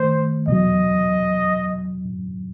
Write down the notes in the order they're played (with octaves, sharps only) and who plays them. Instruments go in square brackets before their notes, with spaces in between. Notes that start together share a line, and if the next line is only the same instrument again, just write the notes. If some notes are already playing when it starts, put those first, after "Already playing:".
Already playing: [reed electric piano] D#3 A3 [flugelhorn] C5
[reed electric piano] E2 B2 F#3 [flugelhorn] D#5